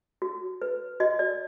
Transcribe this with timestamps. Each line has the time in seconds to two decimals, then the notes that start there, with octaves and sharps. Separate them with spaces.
0.22 F#4
0.62 B4
1.00 F#4 D#5
1.19 D5